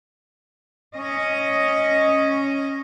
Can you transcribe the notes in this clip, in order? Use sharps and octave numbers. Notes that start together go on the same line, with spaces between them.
C#4 D#5